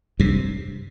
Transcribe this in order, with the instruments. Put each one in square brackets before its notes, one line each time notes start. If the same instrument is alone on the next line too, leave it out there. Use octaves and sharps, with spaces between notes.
[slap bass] G2 C3